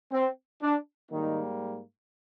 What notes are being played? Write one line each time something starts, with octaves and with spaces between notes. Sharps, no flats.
C4
D4
G#2 D#3 G3 A#3 D#4